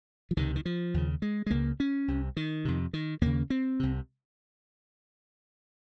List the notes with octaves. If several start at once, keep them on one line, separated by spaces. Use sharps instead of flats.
F3
C#2 C3 D#3
D#3
F3
D#2 C#3
G#3
G#3
C#2 C#3 A#3
C#4
C2 C3
D#3
F2 C3
D#3
D#2 C#3 A#3
C4
C2 C3